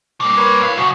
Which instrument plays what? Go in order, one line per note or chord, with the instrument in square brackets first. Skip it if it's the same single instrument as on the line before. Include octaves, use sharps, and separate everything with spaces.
[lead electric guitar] G2 A#3
[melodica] A#4 B4 C#5
[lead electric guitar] E4 F5
[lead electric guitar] F#2 C#3 [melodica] F#4